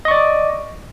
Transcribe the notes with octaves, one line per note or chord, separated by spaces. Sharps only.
D5 D#5 C#6 D6